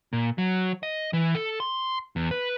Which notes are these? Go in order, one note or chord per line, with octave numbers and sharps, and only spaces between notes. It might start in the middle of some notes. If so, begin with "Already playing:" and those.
A#2
F#3
D#5
E3
A4
C6
E2
B4